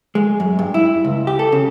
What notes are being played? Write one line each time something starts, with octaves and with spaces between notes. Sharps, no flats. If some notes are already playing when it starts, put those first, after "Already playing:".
G#3
F#2
G2
E4
C#2
G4
A4
C#3